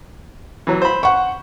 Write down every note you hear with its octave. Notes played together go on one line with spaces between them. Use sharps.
E3 F#3
C5 B5
F#5 C#6